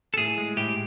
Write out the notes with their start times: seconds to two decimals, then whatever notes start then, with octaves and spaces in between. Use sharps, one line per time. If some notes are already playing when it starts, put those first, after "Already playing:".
0.14 A4
0.18 A2 G#4
0.38 G#3
0.57 A2 G4